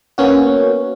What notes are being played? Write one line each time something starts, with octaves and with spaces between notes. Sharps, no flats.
A#3 B3 C#4 F#4